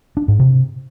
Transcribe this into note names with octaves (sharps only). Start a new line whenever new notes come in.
D4
G#2
C3